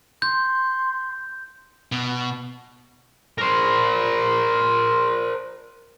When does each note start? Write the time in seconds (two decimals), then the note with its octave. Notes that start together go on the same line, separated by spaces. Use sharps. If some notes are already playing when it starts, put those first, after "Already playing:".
0.22 C6 G6
1.92 B2
3.38 A#4 C5